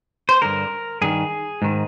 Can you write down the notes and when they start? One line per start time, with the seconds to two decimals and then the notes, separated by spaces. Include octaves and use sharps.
0.29 C5
0.42 G2 D3 A#4
1.01 G2 D#3 G#4
1.62 G#2 D#3